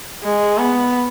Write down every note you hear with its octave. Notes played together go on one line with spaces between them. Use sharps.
G#3
B3